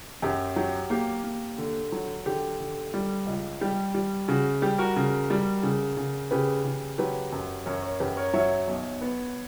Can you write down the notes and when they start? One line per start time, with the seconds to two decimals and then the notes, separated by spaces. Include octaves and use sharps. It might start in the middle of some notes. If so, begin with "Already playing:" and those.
0.22 F#2 G4
0.56 F#3 G4
0.90 A#3 G4
1.24 A#3
1.58 D3
1.92 F#3
2.26 D3 G4
2.60 D3
2.94 G3
3.26 C#2
3.61 G3 G4
3.95 G3
4.28 C#3 F#4
4.62 G3 G4
4.78 F#4 A#4
4.96 C#3
5.30 G3
5.63 C#3
5.97 C#3
6.31 C#3 G4 B4
6.64 C#3
6.98 F#3 G4 B4
7.32 F#2
7.66 F#2 A#4 C#5
7.83 A#4 C#5
8.00 F#2 G4 B4
8.17 A#4 C#5
8.33 F#3 C#5 E5
8.67 B1
9.01 B3